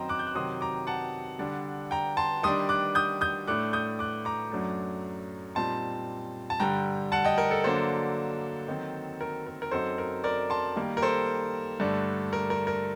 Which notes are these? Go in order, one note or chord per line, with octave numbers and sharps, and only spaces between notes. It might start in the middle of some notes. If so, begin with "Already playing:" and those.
Already playing: F#2 D#3 F#3 C4 C5 D#5 G5 A#5
D6 F#6
G6
F#6
C3 D#3 F#3 C4 C6 D#6
A#5 D6
F#5 A5
D3 G3 D4
G5 A#5
A5 C6
D#3 G3 D4 C6 D#6
D6 F#6
D#6 G6
D#6 G6
A2 A3 D4 D6 F#6
D#6 G6
D6 F#6
A#5 D6
F#2 F#3 A3 D4
A#2 G3 C4 D#4 A5 C6
A5
G2 D3 G3 G5 A#5
F#5 A5
D#5 G5
A#4
A4
D3 F#3 A#3 D4 A4 C5
D#3 F#3 C4
A#4
A#4
A#4
F#2 F#3 C4 D#4 A4 C5
A#4
A#4 D5
A5 C6
D#3 G3 A#3
A#4
A4 C5
G2 D3 A3 D4
A#4
A#4
A#4